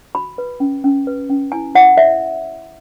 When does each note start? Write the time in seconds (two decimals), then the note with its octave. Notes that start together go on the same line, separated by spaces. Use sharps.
0.15 F#4 B5
0.38 B4
0.60 C#4
0.84 C#4
1.07 B4
1.29 C#4
1.52 E4 G#5
1.75 E4 F#5
1.97 C#5 E5